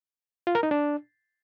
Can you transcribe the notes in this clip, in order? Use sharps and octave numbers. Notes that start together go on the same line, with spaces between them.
F4
A#4
D#4
D4